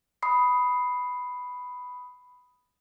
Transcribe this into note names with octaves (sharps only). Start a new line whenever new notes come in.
B5 D#6 C7